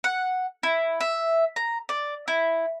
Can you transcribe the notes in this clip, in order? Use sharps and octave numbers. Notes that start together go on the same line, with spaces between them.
F#5
E4
E5
A#5
D5
E4